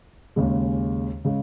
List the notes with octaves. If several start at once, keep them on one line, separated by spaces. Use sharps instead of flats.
D#2 C#3 G#3
C#3 G#3